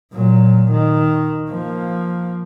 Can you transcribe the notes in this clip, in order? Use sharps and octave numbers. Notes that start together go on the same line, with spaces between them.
A#2 F#3
D#3
F3 A#3